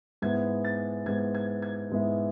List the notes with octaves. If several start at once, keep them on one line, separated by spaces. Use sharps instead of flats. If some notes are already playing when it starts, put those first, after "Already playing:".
G#2 G#3 B3 E4 G#6
A6
G#2 G#3 B3 E4 G#6
G#6
G#6
G#2 G#3 B3 E4